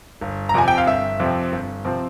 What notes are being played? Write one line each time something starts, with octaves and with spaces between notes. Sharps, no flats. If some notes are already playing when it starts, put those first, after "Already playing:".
G1
A#5
F2 C3 F3 C4 G#5
G5
F5
G1 E5
F2 C3 F3 C4
G1
C3 F3 C4